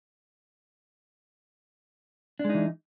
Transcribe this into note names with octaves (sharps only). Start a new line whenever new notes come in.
E3 G#3 D4 D#4